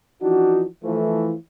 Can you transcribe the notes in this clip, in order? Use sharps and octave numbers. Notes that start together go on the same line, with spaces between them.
E3 F3 D4 D#4 F#4
E3 F3 A3